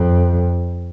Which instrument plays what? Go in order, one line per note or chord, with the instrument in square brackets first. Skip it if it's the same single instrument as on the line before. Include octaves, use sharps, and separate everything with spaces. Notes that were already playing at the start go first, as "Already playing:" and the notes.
Already playing: [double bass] F2